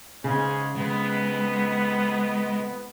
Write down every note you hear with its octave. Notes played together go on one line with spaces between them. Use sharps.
G#2 C#3 G#3 C#4
F2 G#3 B3